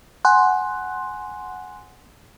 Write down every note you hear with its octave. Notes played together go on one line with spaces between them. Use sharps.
F#5 G#5 C6 F#6